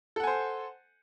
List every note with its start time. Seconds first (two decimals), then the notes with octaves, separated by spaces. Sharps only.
0.16 A4
0.20 F#5
0.24 G#5
0.27 C5